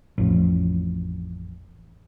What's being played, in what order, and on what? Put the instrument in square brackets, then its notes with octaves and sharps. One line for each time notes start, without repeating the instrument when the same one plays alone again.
[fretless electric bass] A1 F2